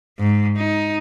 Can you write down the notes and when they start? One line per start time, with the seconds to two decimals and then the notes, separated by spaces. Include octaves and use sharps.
0.19 G#2
0.57 D#4